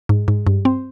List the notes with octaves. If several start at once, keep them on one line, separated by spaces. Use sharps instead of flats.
G#2
G#2
G2
C4